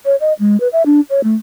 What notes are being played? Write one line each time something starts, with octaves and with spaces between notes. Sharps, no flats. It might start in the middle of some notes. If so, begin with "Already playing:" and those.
C#5
D#5
G#3
B4
E5
D4
C#5
A3